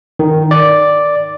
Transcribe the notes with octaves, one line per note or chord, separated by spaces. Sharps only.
D#3
D5